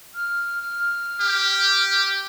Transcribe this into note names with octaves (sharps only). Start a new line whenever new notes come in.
F6
G4